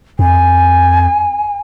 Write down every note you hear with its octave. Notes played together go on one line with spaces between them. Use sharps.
F2 G#5